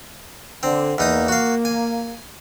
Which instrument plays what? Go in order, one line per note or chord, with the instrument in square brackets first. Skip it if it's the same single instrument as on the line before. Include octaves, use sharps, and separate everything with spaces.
[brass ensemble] D3 [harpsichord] C4
[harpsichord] E2 D#4 D#6 [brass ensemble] A#3
[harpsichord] F#4 F5
G#5